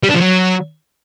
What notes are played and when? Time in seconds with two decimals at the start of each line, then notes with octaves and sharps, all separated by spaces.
0.03 G3
0.09 D4
0.15 F3
0.21 F#3